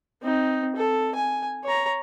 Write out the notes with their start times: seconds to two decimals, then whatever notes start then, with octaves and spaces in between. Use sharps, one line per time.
0.22 C4 D#4
0.76 A4
1.15 G#5
1.64 C#5 A#5